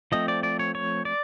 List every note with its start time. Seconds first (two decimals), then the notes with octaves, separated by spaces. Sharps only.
0.12 F3 A3 C4 D#5
0.28 D5
0.43 D5
0.59 C#5
0.75 C#5
1.05 D5